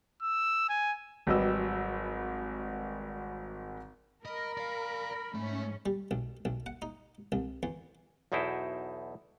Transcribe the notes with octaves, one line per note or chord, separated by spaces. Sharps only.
E6
G#5
G#1 F#3 G3 B4 D#5 E6
A#4 D#5 B5
D5 F5
G#2 A3 C#4 E5
G3
B1
B1
F#5
D#4
C2
E2
B1 E2 B2 D#4 E4 C5